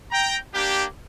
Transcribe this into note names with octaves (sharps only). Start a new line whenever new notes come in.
G5 A#5
A#3 D4 G4